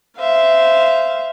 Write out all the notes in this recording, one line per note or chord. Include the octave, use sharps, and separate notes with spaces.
C5 E5 F5